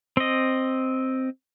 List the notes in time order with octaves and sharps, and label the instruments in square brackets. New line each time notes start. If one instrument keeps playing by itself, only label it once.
[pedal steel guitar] C4 D#5